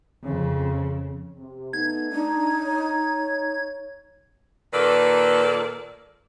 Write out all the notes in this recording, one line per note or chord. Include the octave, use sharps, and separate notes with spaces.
F2 C#3
C3
A3 B3 D#4 G#6
D4 D#4
C#5
A#2 D#3 A#3 A4 B4 D5